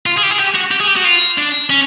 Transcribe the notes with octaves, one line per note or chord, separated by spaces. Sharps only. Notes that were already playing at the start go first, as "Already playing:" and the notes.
F4
G#4
G4
G#4
G4
F#4
G4
G#4
G4
F#4
F4
D4
C#4